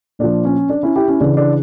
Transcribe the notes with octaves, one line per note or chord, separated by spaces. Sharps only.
A#2 F3 D4
C#4
D4
C#4 E4
E4 G4
C#4 E4
C#3 E3 D4
D4